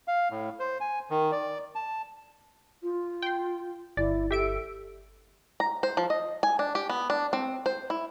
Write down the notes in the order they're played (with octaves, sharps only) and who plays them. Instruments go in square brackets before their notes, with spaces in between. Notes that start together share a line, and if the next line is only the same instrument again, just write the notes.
[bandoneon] F5
A2
C5
G#5
D#3
D5
A5
[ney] F4
[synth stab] G5 C6
[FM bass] G1 [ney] E4 [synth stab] D5
[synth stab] G4 E5 D7 [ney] A4
[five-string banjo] A#5
C5
F3
D#5
G#5
D4
G4
B3
D4
C4
C5
E4